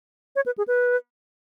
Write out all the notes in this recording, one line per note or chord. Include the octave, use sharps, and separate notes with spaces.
C#5
B4
G#4
B4